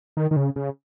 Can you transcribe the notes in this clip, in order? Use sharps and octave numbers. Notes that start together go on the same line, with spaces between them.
D#3
D#3
C#3
C#3